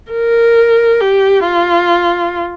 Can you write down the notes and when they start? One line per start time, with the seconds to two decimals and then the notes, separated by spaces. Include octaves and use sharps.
0.12 A#4
1.01 G4
1.45 F4